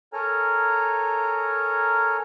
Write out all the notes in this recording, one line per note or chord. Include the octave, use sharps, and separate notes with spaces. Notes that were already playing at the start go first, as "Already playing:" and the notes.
A4 A#4 C#5 G#5 A#5 F6